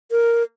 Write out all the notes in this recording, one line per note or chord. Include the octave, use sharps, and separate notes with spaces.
A#4